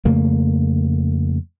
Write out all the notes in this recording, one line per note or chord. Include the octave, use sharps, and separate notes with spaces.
F2 C#3 A3 A#3